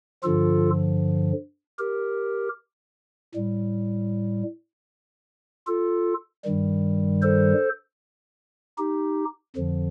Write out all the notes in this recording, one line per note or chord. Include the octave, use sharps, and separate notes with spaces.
G2 D3 F3 F4 A4
G4 A#4
A2 G3
F4 A4
G2 D#3 G3
A4 C5
D#4 G4
F2 D3 F3